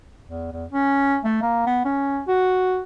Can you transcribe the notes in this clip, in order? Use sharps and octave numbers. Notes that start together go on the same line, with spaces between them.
E2
E2
C#4
A3
A#3
B3
C#4
F#4